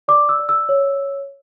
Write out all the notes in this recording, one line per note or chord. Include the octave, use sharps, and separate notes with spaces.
D5 D6
E6
D5
E6
C#5